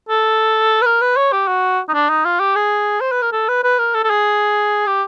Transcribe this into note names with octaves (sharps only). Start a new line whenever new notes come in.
A4
B4
A#4
B4
C#5
G4
F#4
D#4
D4
D#4
F4
G4
G#4
C5
B4
A#4
A4
B4
B4
A#4
A4
A4
G#4
G4